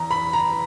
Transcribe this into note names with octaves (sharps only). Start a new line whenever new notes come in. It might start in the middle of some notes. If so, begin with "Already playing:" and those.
Already playing: E2 A#5
B5
A#5